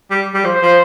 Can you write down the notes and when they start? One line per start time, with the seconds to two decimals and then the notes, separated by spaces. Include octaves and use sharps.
0.11 G3
0.34 G3
0.44 F3 C5
0.62 F3